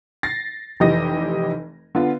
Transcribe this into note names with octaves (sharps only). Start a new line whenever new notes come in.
A6 A#6 C7
F1 E3 G4 D#5 A#6
D3 B3 F4